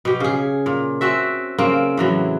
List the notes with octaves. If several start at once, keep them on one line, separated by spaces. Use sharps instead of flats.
B2 G4
C#3 G#4
A#2
C4 C#4 F#4 E5
C#3 A#3 C4
A2 E3 F#3